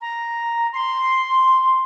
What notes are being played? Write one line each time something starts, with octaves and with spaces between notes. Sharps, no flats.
A#5
C6